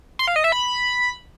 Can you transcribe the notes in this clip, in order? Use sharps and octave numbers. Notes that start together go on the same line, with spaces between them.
C6
F5
D#5
E5
B5